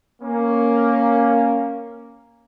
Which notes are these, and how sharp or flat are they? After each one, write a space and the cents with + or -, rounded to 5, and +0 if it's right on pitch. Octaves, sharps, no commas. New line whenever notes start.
A#3 +0 C#4 +0